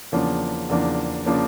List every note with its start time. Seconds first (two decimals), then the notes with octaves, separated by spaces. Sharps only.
0.12 E2 C#3 F3 A#3 D4
0.69 E2 C#3 F3 A#3 D4
1.26 C#3 F3 A#3 D4